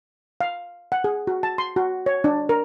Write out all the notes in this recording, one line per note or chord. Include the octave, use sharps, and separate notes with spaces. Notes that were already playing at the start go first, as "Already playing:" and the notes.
F5
F#5
G#4
F#4
A5
C6
F#4
C#5
D4
A#4